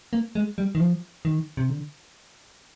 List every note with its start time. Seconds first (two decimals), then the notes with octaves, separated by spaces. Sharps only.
0.13 A#3
0.35 G#3
0.58 G3
0.75 D#3
0.80 F3
1.25 D#3
1.57 C3
1.69 D3